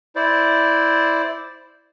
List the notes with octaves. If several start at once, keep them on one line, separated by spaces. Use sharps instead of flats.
E4 C5 D5